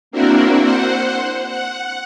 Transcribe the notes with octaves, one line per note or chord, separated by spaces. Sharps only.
A#3 C4 D4 E4 F#4 A#4
C5 F#5
F#5